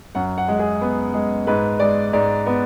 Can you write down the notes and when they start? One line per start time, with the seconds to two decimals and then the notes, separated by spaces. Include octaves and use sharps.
0.15 F#2 F#5
0.38 F#5
0.48 G#3
0.59 G#4
0.81 B3
1.14 G#3
1.47 G#2 B4
1.80 G#3 D5
2.13 G#2 D5
2.46 B3